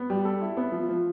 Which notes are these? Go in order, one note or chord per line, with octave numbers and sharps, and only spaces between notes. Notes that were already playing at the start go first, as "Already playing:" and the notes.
Already playing: B3
G3
A4
E4
B3
F3
F3